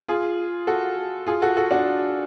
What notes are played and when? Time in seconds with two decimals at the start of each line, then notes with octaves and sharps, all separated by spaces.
0.08 F4 G#4
0.67 F#4 A4
1.27 F4 G#4
1.42 F#4 A4
1.57 F#4 A4
1.71 D4 F#4